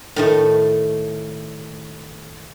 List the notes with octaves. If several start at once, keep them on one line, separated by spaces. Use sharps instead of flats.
A2 D#3 A3